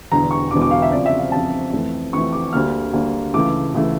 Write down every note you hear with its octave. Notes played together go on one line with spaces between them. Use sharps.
E1 E2 D3 A#5
C#6
E1 E2 D3 D6
D6
F5
E5
F2 C#3 F3 D5
E5
F5
F2 C#3 F3 A5
F2 E3 A3
F2 E3 A3 C#6
D6
D2 D3 G3 A#3 F6
D2 D3 G3 A#3
C#2 C#3 E3 A3 D6
C#2 C#3 E3 A3